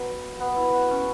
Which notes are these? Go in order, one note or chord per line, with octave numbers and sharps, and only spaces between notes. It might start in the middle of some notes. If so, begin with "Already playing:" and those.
Already playing: F#3 B3
B3
E4
F#4
C#4